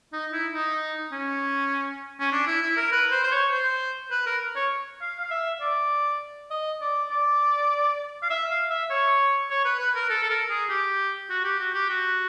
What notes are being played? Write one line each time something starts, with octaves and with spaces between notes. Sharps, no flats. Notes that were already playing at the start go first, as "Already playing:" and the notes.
D#4
E4
D#4
C#4
C#4
D4
E4
E4
A#4
B4
C5
C5
C#5
C5
B4
A#4
C#5
F5
F5
E5
D5
D#5
D5
D5
F5
E5
F5
E5
C#5
C#5
B4
B4
A#4
A4
A4
A#4
G#4
G4
F#4
G4
F#4
G4
F#4